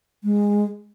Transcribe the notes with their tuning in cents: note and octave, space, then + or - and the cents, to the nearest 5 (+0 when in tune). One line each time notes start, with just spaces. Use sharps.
G#3 -15